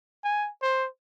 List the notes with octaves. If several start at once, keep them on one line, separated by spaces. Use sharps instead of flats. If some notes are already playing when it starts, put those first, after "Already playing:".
G#5
C5